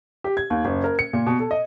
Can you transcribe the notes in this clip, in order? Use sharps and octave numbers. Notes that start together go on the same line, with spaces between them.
G4
G#6
D#2
F#1
A#4
C#7
A#2
B2
A4
D#5